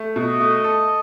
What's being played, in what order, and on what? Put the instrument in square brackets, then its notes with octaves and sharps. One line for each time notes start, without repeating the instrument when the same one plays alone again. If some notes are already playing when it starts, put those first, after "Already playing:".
Already playing: [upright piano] A3
[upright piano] B2 [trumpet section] D#5
[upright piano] A3
A4